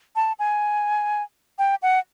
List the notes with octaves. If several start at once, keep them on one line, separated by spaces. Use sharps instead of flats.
A5
G#5
G5
F#5